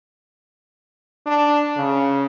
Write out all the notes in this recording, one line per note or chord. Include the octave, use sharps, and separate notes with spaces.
D4
C#3